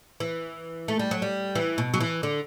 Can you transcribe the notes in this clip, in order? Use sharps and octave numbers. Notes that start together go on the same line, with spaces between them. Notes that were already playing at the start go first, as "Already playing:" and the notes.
E3
A3
G3
F#3
G3
E3
B2
F#3
E3
D3